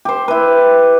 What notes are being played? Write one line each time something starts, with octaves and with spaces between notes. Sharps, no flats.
G4 C5
E4 B4